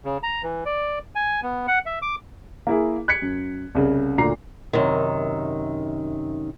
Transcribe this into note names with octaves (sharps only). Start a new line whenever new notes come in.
C#3
A#5
E3
D5
G#5
B3
F#5
E5
D6
A#3 E4 G#4
F#6 G#6 B6 C#7
F#2
C2 C#3
D2 A#2 A#5 C7
F#2 C3 D#3